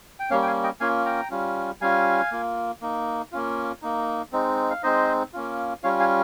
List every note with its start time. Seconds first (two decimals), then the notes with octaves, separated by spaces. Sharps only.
0.20 G5
0.30 G3 A#3 C#4 C#5 F5
0.42 G5
0.47 F5 G#5
0.63 D#5 G5
0.80 A#3 C#4 F4 F5 G#5
1.05 G5 A#5
1.31 G3 C#4 F4
1.81 G3 C#4 F4 F5 G#5
2.32 A#3 F4
2.81 A#3 D#4
3.32 A#3 C#4 F4
3.82 A#3 D#4
4.32 G#3 C4 D#4
4.71 F5
4.83 G#3 C4 D#4 C5 D#5
5.33 A#3 C#4 F4
5.83 G3 C#4 F4 C#5 F5
6.00 F5 G#5